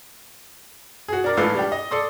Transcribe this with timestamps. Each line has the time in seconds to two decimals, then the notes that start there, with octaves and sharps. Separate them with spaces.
1.08 F#4 G#4
1.24 D4 A#4 D5
1.37 A1 G#2 E3 F4 A4 B4
1.55 G3 D4 G4
1.72 D#5
1.91 A4 D5 C6 D#6